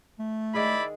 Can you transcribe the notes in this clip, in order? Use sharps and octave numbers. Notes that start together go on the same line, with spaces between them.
A3
D#3 G#3 E4 G#4 D5 B5